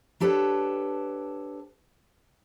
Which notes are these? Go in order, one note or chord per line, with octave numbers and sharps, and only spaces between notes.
D4 G4 A4 B4 C#5